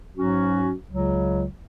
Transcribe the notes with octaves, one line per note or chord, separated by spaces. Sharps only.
G#2 F#3 C#4 F#4
C#2 C#3 F#3